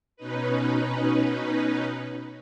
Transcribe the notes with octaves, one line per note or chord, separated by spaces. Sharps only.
B2 C#4 D#4 B4